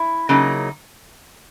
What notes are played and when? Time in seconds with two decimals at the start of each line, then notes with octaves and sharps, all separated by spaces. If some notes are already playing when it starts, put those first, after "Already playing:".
Already playing: E4
0.29 C#3 F#3 A#3 D#4